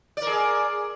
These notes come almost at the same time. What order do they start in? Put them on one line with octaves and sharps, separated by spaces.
D5 A#4 G#4